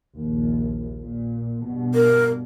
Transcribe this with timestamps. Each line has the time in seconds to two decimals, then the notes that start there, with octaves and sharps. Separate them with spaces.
0.16 A#1 D#2
1.00 A#2
1.62 G2 B2
1.95 A#4